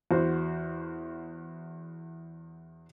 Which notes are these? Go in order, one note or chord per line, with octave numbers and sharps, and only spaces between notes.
E2 F#4 C5